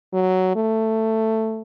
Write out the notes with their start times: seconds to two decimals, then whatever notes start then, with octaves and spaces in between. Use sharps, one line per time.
0.13 F#3
0.56 A3